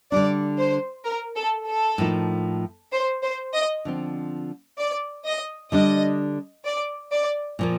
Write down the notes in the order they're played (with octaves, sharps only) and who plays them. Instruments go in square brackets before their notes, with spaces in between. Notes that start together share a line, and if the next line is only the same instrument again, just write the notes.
[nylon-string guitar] D3 G3 D4 [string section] D5
[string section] C5
A#4
A4
A4
[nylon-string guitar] A2 F3 A#3 D#4
[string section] C5
C5
D#5
[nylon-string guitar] D3 F3 C4
[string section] D5
D#5
[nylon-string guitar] D3 G3 D4 [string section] D#5
[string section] D5
D5
[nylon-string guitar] A#2 F3 A#3